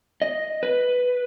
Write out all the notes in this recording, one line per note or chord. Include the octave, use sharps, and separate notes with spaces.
D#5
B4